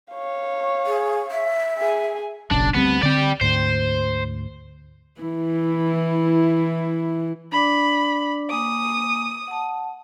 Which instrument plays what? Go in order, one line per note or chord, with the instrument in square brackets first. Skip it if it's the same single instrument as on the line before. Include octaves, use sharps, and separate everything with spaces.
[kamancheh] C#5 F5
[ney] G#4
E5
[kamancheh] G#4 G#5
[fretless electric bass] F#1 B1 F#2 [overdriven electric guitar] D4
[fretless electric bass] D2 G3 C4 [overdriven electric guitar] B3
[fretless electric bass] D3 C4 [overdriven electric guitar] D5 G5
[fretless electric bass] D2 G#2 [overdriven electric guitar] C5
[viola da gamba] E3 E4
[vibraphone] D4 D5 D6 [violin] B5
[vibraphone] A#3 G#5 D6 [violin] D#6
[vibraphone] F#5 A5